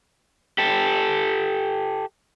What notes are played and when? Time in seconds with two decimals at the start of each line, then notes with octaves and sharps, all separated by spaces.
0.58 G4 A4